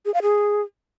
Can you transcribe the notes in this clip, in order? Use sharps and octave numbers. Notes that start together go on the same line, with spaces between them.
G#4
F5
G#4